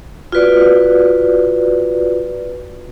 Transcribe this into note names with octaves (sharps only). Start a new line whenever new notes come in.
F4 F#4 B4 D5